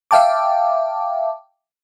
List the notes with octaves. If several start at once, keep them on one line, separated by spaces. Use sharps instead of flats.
E5 F5 G5 A5 D6